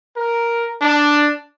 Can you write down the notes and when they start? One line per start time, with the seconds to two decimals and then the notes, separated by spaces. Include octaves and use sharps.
0.15 A#4
0.80 D4